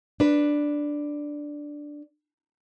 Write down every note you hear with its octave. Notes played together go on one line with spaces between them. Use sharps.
D4 B4